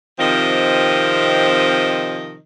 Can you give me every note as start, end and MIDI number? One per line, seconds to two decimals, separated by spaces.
0.20 2.37 48
0.20 2.37 51
0.20 2.37 53
0.20 2.37 60
0.20 2.37 75